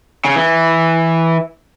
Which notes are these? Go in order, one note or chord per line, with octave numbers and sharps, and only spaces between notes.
C#3
E3